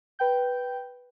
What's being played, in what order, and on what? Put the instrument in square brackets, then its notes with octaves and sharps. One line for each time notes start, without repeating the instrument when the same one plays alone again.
[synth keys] B4 G5 G6